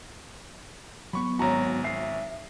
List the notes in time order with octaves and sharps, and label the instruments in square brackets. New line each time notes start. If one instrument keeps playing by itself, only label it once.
[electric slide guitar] F#3 B3 [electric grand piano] B5 C#6
[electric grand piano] G#1 F#4 [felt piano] C#5 A#5
[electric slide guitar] E5 [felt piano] C7